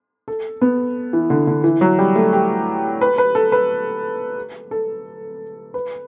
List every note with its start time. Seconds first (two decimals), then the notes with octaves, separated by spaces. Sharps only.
0.28 A4
0.61 B3
1.13 E3
1.30 D3
1.47 D3
1.64 E3
1.81 F#3
1.99 G3
2.15 A3
2.33 G4
3.01 B4
3.18 B4
3.35 A4
3.52 B4
4.71 A4
5.74 B4